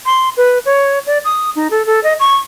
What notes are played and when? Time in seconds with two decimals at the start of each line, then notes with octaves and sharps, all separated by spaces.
0.06 C6
0.37 B4
0.66 C#5
1.07 D5
1.25 D#6
1.56 D#4
1.71 A4
1.86 A4
2.04 D#5
2.20 C#6